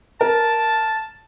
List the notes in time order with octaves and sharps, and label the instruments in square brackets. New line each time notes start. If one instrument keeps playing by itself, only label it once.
[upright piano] A#4 [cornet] A5